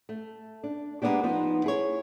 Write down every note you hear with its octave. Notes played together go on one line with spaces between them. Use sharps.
A3
D4
G#3 A#3 B3 C#4 D4 G4
F3 B3 D#4 F4
E4 G#4 C#5